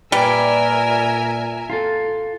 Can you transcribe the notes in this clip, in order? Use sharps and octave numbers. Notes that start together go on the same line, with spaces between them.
A#2 G3 A#4 B4 D5 E5 G#5
F4 A4